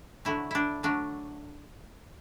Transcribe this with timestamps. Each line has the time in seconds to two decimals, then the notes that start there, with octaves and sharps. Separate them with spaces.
0.25 D3 F#3 A3 E4
0.51 D4 E4
0.83 D3 F#3 A3 D4